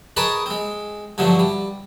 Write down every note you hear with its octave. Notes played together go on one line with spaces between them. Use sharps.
G#4 A#4 B4 C#5 D#5 A5
G#3 C4
G2 D3 F3 F#3 A3
G3